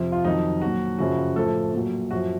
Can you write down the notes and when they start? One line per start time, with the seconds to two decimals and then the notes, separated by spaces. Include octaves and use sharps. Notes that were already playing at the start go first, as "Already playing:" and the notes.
Already playing: F2 C3 F3
0.12 F4
0.24 F2 D#3 F#3 D#4
0.62 A#2 F#3 F#4
0.99 F#2 C#3 F3 F#4
1.36 A2 F3 A4
1.74 A#2 F#3
2.11 F#2 F3 F#4